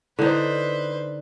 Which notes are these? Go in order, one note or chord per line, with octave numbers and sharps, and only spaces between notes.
D3 D#4 E4 B4 C5 D5